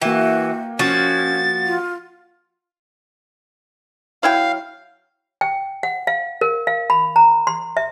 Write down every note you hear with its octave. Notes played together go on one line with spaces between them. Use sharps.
E3 A#3 F#4 G5
F3 C#4 F#4 A6
F4
F#3 E4 F5 G5
G5
F#5
F5
A#4
F5
B5
A#5
C6
E5